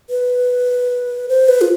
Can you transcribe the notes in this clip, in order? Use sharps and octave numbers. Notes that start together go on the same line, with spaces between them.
B4
C5
B4
F4